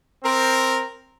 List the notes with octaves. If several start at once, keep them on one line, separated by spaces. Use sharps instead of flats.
C4 A#4